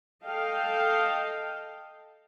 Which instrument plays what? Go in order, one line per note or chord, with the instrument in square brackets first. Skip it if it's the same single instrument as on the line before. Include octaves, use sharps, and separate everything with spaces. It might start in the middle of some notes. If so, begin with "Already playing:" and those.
[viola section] A4 D#5 F5 G5 A5